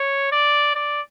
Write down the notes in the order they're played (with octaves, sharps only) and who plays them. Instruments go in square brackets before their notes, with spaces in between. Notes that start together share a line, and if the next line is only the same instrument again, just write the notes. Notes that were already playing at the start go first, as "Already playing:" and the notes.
Already playing: [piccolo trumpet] C#5
D5
D5